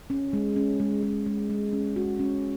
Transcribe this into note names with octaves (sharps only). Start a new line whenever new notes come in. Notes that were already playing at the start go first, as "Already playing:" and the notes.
C#4
G#3
C#4
G#3
G#3
G#3
G#3
C#4
F#4
C#4